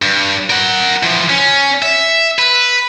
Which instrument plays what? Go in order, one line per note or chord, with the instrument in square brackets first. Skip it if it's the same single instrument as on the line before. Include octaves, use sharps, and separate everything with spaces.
[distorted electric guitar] G2
A#4 F#5
E3 F3
C#4
E5
B4